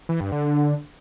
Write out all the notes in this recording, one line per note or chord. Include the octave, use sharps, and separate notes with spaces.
E3
G2
D3